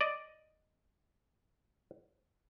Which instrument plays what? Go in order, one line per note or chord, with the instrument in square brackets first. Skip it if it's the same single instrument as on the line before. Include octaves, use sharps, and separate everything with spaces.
[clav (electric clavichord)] D5 D#5